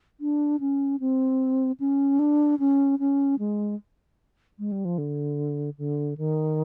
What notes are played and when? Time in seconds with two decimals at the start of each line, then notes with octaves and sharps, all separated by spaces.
0.20 D4
0.60 C#4
1.00 C4
1.80 C#4
2.19 D4
2.59 C#4
2.99 C#4
3.39 G#3
4.59 G#3
4.72 G3
4.85 F3
4.98 D3
5.78 D3
6.17 D#3